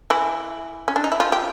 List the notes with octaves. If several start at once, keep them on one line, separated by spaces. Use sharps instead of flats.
E3 E4
C#4
D4
D#4
E4
F3 F4
G4